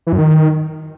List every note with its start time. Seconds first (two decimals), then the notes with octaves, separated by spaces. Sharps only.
0.07 E3
0.13 F#2
0.18 D#3